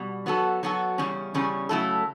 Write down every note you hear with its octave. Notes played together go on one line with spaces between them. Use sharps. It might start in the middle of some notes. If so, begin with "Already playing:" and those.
Already playing: B2 G3
F#3 B3 F#4 A4
F#3 B3 F#4 A4
E2 C#3 G3 C#4
E2 C#3 G3 C#4
C#3 F#3 A3 E4 A4